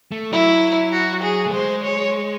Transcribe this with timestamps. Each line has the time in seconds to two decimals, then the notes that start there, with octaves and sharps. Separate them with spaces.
0.12 A3
0.32 F#3 E4
0.92 F#4
1.23 G#4
1.46 A3
1.53 G#3 C5
1.83 C#5